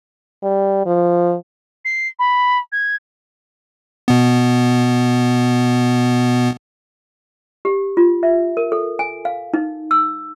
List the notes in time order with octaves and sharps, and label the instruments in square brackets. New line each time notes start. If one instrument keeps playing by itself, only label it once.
[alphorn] G3
F3
[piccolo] C7
B5
G#6
[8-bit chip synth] B2 B3
[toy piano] G4
F4
E5
A#4
A4
G#5
F5
D#4
E6